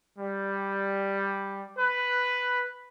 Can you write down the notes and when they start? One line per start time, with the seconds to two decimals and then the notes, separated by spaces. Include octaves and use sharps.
0.19 G3
1.78 B4